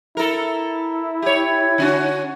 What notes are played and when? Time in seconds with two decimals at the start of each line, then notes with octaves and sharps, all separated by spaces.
0.17 E4 A4 A#4
1.22 G4 C#5
1.78 D3 C#4 F#4